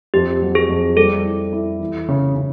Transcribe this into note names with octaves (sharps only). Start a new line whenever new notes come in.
F2 G4
F#3
G#4
F2
G3 A4
E4
E4
E3
C#3
C#3